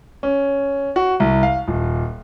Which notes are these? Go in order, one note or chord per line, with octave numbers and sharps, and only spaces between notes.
C#4
F#4
C2
F5
D#1